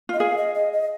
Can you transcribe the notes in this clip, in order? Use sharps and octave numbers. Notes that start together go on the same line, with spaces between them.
F4 D#5
G#4 F5
D#5
D#5
D#5